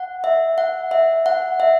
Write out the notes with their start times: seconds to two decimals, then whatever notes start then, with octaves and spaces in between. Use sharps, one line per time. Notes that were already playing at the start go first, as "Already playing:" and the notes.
Already playing: F#5
0.24 E5
0.58 F#5
0.91 E5
1.26 F#5
1.60 E5